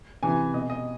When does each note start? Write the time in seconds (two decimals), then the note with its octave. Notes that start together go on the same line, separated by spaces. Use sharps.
0.23 C3 E3 G#5
0.53 B2 D#5
0.70 D#5